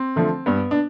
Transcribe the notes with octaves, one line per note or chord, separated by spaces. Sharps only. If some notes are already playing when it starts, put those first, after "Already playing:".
Already playing: C4
D3 F3 A3
G2 B3
D4